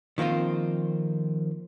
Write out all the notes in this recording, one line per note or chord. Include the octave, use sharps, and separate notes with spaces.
D#3 F3 A#3 C4 F4